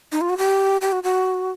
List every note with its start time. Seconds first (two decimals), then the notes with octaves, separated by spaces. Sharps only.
0.12 D#4
0.21 F4
0.29 F#4
0.38 G4
0.81 G4
0.92 F#4
1.03 F#4